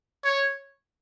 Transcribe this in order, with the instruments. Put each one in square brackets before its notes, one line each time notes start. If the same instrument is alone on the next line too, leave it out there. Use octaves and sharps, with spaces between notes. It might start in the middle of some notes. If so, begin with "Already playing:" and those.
[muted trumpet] C#5